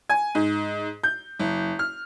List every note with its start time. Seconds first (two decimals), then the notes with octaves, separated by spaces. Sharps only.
0.09 G#5
0.35 G#2
1.04 G6
1.40 F#1
1.79 F6